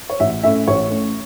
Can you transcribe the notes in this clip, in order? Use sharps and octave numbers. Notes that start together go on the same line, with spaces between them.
C#5
A1 E5
A2 A3 C#4 E5
A1 C#5
A2 A3 C#4